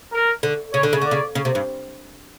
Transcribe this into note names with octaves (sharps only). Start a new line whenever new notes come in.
A#4
D3
C#3 C#5
D3
C#3
D3 D5
C#3
C#3
C3
G2